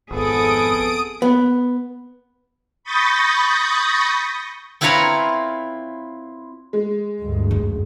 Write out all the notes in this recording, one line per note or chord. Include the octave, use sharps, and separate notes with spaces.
G#1 F2 B3 G#4 A4 D#6 D7
B3
B5 C#6 D#6 G6 A6 A#6
C4 E4 F4 B4 C#5 A#5
G#3
D2 G2
F#2